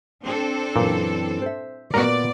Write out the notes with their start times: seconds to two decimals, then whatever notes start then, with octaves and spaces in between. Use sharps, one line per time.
0.24 C4 D4 A4
0.76 F#2 A#2 E3
1.42 C5 E5
1.94 A#2 B3 F#4 A#4 D5 A5